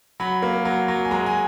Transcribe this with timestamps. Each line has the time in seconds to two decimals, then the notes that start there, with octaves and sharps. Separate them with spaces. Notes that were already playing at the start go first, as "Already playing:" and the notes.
0.20 F#3 B5
0.42 A#3
0.65 F#3
0.88 F#3
1.05 G#5
1.11 G#3 A#5
1.26 G#5